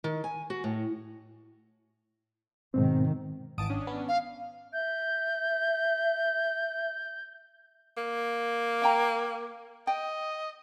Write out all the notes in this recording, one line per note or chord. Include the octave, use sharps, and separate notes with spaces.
D#3
G#5
F#4
A2
G#2 B2 D#3 C4
G#1 E3 A5 D#6 D7
C#4 D4
B3
F5
E5 G6
A#3
F5 G5 A#5
D#5 G5